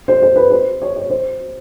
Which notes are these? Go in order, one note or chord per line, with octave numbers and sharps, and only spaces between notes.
C5
C5
B4
C5
C#5
C#5
C5